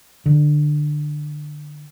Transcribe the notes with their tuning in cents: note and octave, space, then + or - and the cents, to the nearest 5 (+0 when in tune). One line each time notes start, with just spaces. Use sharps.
D3 +20